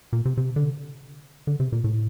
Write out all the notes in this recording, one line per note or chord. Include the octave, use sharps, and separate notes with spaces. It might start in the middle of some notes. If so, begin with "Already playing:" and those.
A#2
C3
C3
D3
D3
C3
A#2
A2